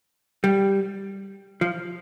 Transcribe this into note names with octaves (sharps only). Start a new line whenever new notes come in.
G3
F3